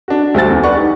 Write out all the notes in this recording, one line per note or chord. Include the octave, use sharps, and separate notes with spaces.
D4 F#4
D2 G3 C4 F#4 A4 A6
E2
B4 D5 F#5 C#6
D#4 G4